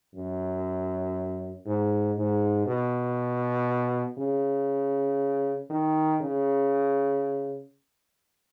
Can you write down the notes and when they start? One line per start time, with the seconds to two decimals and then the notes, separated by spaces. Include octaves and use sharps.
0.15 F#2
1.66 G#2
2.17 G#2
2.67 B2
4.18 C#3
5.70 D#3
6.21 C#3